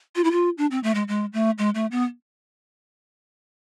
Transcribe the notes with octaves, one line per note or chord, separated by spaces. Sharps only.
F4
E4
F4
D4
C4
A3
G#3
G#3
A3
G#3
A3
B3